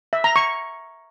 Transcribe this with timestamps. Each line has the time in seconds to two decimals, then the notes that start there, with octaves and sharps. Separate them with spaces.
0.13 E5
0.24 A#5
0.36 C#6